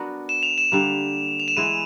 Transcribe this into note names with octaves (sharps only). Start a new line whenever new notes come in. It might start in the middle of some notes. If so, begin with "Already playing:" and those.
Already playing: B3 D4 F#4 A#4
E7
F7
E7
D3 G3 A#3
F7
E7
E3 G#3 B3 E4 D#7